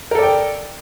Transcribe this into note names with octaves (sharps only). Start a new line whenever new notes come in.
A4 A#4 D5 G5